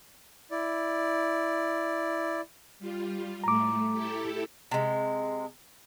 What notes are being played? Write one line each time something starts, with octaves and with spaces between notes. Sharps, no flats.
E4 D5
G3 F4
A2 A3 A#5 D6
E4 G4 A4
C3 G#3